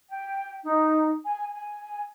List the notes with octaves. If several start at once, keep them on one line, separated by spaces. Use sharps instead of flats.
G5
D#4
G#5
G#5